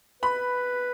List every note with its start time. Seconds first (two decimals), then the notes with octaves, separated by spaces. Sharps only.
0.23 B4 B5